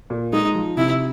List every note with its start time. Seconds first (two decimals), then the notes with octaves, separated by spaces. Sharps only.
0.10 A#2
0.33 G#3 D#4
0.54 F3
0.77 C3 E4